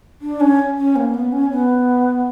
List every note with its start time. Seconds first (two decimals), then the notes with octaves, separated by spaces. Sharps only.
0.22 D4
0.41 C#4
0.77 C#4
0.96 A#3
1.14 B3
1.32 C#4
1.50 B3